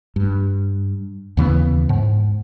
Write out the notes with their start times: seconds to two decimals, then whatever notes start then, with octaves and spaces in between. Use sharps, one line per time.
0.16 G2
1.37 D#2 C#3 E3 B3
1.89 G#2